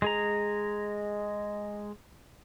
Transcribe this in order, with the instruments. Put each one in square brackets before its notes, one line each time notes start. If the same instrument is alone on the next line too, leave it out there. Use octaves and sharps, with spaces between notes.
[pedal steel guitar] G#3 G#4 A#5